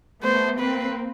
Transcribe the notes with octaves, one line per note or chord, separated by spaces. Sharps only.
A3 B3 C5
A#3 C4 B4